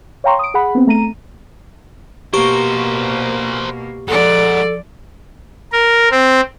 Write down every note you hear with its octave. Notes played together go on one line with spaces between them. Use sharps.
C#5 F5 G5 A#5 C6 C#6
D#6 D7
G#4 F#5 B5
B3 C4
A3 A#5 D#7
B2 A#3 G4 A#4 C5 C#6
F3 G#3 A4 D5 F#5
A#4
C4